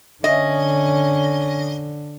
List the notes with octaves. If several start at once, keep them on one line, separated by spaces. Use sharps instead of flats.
D3 C#4 D#5